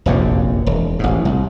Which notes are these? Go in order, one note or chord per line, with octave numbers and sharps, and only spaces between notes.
F1 A#1 F#2 C3
E1
A1 G#2
C2